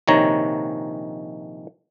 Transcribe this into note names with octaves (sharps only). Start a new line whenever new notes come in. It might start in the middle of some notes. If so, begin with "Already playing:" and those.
A#1 C3 D#3 C#5 A#5